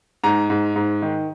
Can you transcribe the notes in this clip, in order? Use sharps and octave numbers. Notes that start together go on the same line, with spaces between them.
G#2 A#5
G#2
G#2
D#3